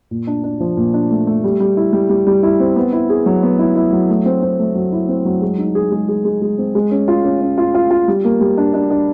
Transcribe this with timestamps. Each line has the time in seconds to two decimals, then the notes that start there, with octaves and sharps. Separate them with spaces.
0.11 A#2
0.27 D4
0.44 D4
0.60 F3
0.77 A#2
0.94 D4
1.11 A3
1.27 A3
1.44 G3
1.60 G3
1.77 E4
1.93 G3
2.09 G3
2.27 G3
2.43 E4
2.60 C4
2.76 B3
2.93 E4
3.10 G#4
3.26 F#3
3.43 B3
3.59 E4
3.76 E4
3.93 F#3
4.09 A3
4.26 C4
4.42 C4
4.59 A3
4.75 F#3
4.92 E4
5.09 C4
5.25 F#3
5.42 G#3
5.58 D#4
5.75 G#4
5.92 G#3
6.08 G#4
6.25 G#3
6.42 G#3
6.58 C4
6.75 G#3
6.91 C#4
7.08 F4
7.25 C#4
7.41 C#4
7.58 F4
7.75 F4
7.91 F4
8.08 G3
8.24 A#3
8.41 G3
8.58 D4
8.74 D4
8.90 D4